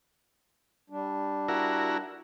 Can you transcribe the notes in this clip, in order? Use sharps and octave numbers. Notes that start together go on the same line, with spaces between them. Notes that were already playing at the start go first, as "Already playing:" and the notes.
G3 D4
E4 F#4 A#4